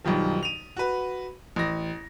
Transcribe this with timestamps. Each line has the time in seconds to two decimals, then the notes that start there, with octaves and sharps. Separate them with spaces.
0.04 B1 G2 D#3 F3
0.43 D#7 F7
0.77 F#4 B4
1.56 A1 A#6